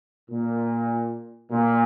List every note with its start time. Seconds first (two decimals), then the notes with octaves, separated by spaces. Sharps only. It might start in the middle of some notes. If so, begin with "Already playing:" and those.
0.31 A#2
1.51 A#2